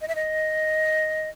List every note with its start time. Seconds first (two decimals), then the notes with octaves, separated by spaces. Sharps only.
0.01 D#5
0.08 E5
0.15 D#5